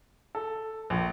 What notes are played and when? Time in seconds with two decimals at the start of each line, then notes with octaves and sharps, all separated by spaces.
0.35 A4
0.90 A#1